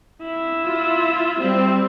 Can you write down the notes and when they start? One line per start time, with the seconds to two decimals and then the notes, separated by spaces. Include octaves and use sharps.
0.22 E4 E6
0.64 F4
1.37 G3 C4